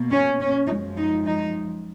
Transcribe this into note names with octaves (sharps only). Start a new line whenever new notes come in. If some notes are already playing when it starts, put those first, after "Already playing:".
Already playing: B2 A#3
C#4
C#4
F#2 F3 G#3 D#4
D#4
D#4